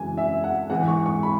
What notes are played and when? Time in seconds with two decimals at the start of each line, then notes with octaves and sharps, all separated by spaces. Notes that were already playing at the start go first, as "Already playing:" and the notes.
Already playing: F#2 C#3 E3 G#3 G#5
0.18 E5
0.44 F#5
0.70 G#2 E3 G#3 F#5
0.88 C#6
1.06 C#6
1.23 B5